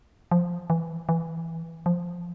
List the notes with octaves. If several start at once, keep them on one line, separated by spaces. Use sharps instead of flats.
F3
E3
E3
F3